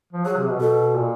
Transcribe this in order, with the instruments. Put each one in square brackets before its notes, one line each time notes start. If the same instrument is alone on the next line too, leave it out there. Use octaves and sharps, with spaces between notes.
[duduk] F3
[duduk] F#3 [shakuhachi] G#4
[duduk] C3
B2
[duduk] B2 [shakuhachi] A4
[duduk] A#2